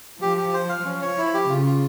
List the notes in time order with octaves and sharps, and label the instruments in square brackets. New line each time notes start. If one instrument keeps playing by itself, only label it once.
[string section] F3 [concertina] G4
[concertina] G4
C5
F5
[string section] F3 [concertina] C#4
[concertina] C#5
E4
G4
[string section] C#3 [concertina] F4
[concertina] F4